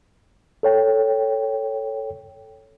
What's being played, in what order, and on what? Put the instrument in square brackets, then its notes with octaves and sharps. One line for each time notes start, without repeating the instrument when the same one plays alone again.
[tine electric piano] A4 C#5 G5